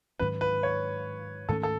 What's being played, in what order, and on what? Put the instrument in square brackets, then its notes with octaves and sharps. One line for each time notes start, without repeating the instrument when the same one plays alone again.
[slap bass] G#2 D#3 F#3 C#4 [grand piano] B4
[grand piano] B4
C#5
[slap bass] G#2 D#3 A3 C#4 [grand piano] A4
[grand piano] A4